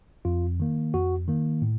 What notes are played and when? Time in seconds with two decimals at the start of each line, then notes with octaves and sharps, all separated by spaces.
0.25 F2 F4
0.60 D#3 A#3
0.94 F2 F#4
1.28 D#3 A#3
1.62 A2